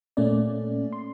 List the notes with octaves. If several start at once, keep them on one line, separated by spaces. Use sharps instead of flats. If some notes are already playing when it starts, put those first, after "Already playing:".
A#2 A3 A#3 C#4 D5
C6